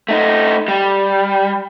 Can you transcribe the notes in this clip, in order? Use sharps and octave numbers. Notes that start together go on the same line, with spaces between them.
A3 D#4
G3